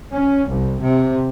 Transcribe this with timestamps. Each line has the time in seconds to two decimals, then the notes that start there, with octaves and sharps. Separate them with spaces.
0.13 C#4
0.49 C2
0.80 C3